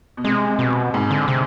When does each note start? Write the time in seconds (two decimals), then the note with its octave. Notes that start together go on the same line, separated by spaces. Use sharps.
0.17 B2
0.24 C3 G#3
0.59 B2
0.94 G#2
1.10 D3
1.28 C3